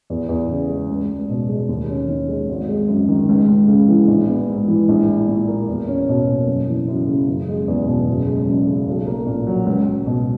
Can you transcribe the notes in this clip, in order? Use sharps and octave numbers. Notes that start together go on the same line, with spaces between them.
E2
E2
C#3
G#3
C#2
C#2
B2
G#3
D#2
C#4
D#3
G#3
G#1
G#3
F#2
D#3
C#2
C#2
C#3
E3
A#1
B3
G#2
E3
A#1
E4
A#2
A#3
E2
C#4
B2
A#3
F#1
E3
F#2
C#3
F#1
G#3
E2
B2
F#1
G#3
F#2
C#3
B1
A#3
A#2
F#3
C#2
C#2
B2